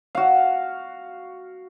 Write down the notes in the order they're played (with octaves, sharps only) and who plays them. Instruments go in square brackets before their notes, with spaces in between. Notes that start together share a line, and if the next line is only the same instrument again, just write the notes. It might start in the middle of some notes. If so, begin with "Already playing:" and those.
[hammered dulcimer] F#4 F5